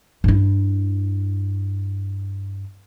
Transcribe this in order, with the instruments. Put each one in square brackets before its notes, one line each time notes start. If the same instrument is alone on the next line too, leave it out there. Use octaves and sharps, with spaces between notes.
[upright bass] G2 E4